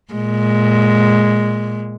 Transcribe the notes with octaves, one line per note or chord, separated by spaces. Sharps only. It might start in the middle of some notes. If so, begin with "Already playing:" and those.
A#2 G#3